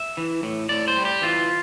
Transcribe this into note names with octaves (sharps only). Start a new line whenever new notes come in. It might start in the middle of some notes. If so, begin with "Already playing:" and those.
Already playing: E5
E3
A2
A2 D5
C5
G3
G4
E3 F4